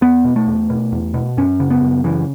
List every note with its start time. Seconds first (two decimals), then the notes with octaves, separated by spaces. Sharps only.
0.01 E2 B3
0.24 B2
0.36 A3
0.47 E2
0.70 B2
0.92 E2
1.14 B2
1.37 F#2 C#4
1.60 C#3
1.70 B3
1.82 F#2
2.04 C#3 E3